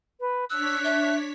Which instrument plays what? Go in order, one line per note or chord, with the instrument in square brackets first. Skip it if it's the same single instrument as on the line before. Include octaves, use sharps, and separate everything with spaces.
[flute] B4
[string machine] D4 C#5 B6 [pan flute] E6 [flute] F#6
[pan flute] E5